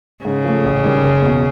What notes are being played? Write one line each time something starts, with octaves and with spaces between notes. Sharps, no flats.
G#2 C#3
F3 A3
A1
G#2 D#3 G3
F#1
E2 B2